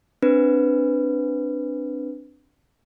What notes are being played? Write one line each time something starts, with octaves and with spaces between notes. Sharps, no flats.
C4 D4 B4